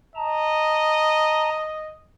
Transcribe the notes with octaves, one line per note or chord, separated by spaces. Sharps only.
D#5 A5 A#5